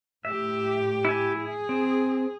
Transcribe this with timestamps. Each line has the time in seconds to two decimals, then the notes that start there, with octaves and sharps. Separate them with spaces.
0.25 A2 G4 E5
1.05 E4 G#5
1.40 G#4
1.69 C4